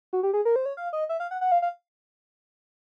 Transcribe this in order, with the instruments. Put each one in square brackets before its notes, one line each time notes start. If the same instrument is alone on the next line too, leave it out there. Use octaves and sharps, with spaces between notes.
[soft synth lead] F#4
G4
G#4
A#4
C5
C#5
F5
D#5
E5
F5
F#5
F#5
F5
F5